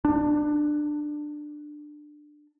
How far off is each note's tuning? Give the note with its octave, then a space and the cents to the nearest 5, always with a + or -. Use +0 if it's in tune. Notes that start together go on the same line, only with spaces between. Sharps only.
D4 +20